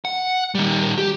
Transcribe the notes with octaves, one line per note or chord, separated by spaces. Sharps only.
F#5
D#3 G3
G4